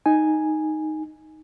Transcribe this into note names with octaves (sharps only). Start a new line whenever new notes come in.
D#4 G#5